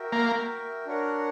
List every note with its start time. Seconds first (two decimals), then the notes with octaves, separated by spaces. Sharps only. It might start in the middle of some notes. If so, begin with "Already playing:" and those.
Already playing: F#4 A#4 E5 G5
0.12 A#3
0.86 D4 F#4 A#4 C#5 F#5